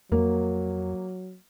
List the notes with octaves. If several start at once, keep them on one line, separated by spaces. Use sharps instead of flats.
F2 F#3 A#3